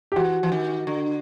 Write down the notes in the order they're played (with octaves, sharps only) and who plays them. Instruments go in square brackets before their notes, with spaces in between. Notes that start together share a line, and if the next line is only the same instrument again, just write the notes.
[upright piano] G4
[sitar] E3 [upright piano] F#4
[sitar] E3
D#3
D3